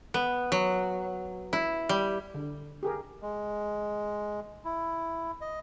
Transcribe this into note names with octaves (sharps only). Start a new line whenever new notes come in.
B3
F#3
E4
G3
D3
G4 G#4 A#4
G#3
E4
D#5